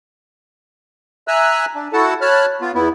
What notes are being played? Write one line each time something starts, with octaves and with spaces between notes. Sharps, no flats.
E5 G#5 A#5 E6 F#6
D4
E4 F#4 A4 F#5 A5
C#5 A5 B5 F6 F#6
B3 F4
E2 B3 E4